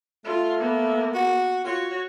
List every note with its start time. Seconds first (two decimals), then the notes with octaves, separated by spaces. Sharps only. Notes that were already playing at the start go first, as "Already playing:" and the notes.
0.25 A3 F4
0.58 A#3 B3
1.14 F#4
1.64 F4 F#4 C#5